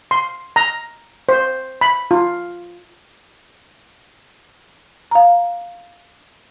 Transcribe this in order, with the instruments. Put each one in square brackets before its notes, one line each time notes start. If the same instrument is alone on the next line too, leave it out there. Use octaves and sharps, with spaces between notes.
[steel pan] C6
A#5
C5
B5
F4
[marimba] F5 A#5